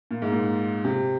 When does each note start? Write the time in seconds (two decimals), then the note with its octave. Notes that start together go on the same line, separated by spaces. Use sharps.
0.11 A#2
0.22 G#2
0.32 A#2
0.84 C3